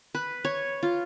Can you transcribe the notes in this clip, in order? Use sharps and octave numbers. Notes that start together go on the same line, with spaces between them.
B4
C#5
F4